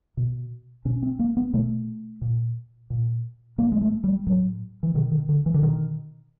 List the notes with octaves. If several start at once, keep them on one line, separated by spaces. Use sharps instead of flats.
B2
B2 C#4
C4
A#3
B3
B2 A3
A#2
A#2
A2 A#3
G#3
A3
G3
A2 F#3
E3
B2 D#3
D#3
D3
E3
D3
B2 D#3